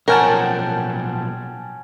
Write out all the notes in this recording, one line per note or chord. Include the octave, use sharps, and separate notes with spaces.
B1 F3 C#4 A#4 F#5 G5 A5